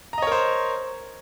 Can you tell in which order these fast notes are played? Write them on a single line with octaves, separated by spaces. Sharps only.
A#5 D#5 C#5 A#4 C5